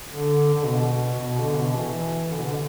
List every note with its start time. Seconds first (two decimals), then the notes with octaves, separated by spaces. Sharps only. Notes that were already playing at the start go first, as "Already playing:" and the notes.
0.09 D3
0.54 D3
0.64 B2
1.20 B2
1.39 D3
1.57 B2
1.76 E3
2.31 D3
2.38 B2
2.45 D3